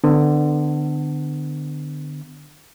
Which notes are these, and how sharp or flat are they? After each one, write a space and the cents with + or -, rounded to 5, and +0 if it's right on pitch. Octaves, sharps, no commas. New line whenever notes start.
D3 +25 B3 +40